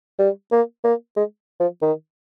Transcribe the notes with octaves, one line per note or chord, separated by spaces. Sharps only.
G3
A#3
A#3
G#3
F3
D#3